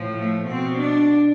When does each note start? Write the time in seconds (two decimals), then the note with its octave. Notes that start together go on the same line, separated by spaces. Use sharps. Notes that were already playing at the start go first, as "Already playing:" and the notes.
Already playing: A2 F3
0.15 A3
0.47 B2 C4
0.79 D4